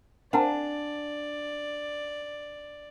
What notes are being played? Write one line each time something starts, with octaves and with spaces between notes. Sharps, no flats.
C4 D4 A#4 D5 F5 F#5 G#5 A5